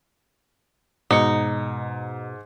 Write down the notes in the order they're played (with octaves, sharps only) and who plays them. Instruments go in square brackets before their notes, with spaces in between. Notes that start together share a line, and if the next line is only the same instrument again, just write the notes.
[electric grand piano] G#2 C#7 [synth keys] B2 [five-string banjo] D#4